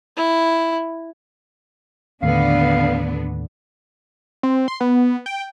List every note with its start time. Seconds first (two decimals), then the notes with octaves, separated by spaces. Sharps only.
0.17 E4
2.23 D#2 A2 D3 B3 D4 F5
4.43 C4
4.68 C6
4.80 B3
5.26 G5